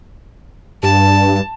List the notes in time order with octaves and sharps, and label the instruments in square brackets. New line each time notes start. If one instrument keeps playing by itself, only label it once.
[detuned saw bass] G2 [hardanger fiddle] A5